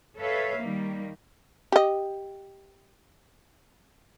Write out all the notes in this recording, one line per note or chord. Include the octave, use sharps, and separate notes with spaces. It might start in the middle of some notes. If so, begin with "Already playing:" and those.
A4 B4 C#5 E5 F5
D#3 G3 A#3
G4 D#5